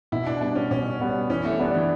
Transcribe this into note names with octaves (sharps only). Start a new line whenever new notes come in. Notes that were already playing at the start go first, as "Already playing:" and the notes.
B2 E4
D4
G3 B3 D4
C#4
B2 C#4
G3 B3
E3 C#4
A3
G3 B3 D4
E3